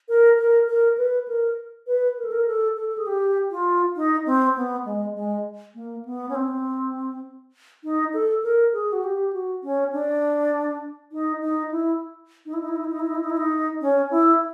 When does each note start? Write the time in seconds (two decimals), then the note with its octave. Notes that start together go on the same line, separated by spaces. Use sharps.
0.09 A#4
0.38 A#4
0.68 A#4
0.98 B4
1.28 A#4
1.87 B4
2.18 A#4
2.25 A4
2.32 A#4
2.47 A4
2.77 A4
2.89 A4
2.98 G#4
3.07 G4
3.51 F4
3.96 D#4
4.26 C4
4.56 B3
4.85 G#3
5.15 G#3
5.75 A#3
6.05 B3
6.29 C#4
6.35 C4
7.84 D#4
8.14 A4
8.44 A#4
8.73 G#4
8.92 F#4
9.04 G4
9.33 F#4
9.63 C#4
9.93 D4
11.12 D#4
11.42 D#4
11.71 E4
12.46 D#4
12.53 E4
12.61 D#4
12.69 E4
12.76 D#4
12.85 E4
12.92 D#4
12.99 E4
13.07 D#4
13.15 E4
13.21 D#4
13.30 E4
13.37 D#4
13.81 C#4
14.11 E4